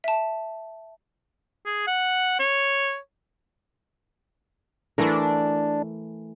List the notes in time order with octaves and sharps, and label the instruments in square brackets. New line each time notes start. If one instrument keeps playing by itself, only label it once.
[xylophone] E5 A5
[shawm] G#4
F#5
C#5
[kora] E3 A3 A#4 [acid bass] D4